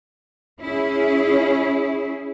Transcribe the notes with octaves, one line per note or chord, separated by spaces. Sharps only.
C#4 E4 G#4